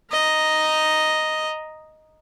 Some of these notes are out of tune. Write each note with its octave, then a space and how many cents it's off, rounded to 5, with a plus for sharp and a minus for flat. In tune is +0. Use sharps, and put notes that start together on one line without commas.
D#5 +0 A#5 +0